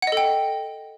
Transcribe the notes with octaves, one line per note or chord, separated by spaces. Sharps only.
A4 D#5 F#5 G5